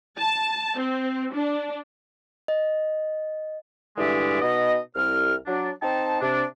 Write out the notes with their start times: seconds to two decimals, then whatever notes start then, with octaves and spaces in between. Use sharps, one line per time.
0.18 A5
0.79 C4
1.33 D4
2.48 D#5
3.98 G2 D3 E3 G#3 D5 E5
4.42 B2 B3 D#4 D#5
4.95 C2 F6
5.47 F#3 D4
5.82 C4 D#4 G5 A5
6.21 C3 D4